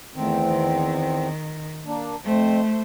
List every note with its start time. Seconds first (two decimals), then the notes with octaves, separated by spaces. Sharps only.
0.15 E2 D#3 A3 C4
0.45 D#3
1.86 A#3 D4
2.24 F2 A3 C4 C5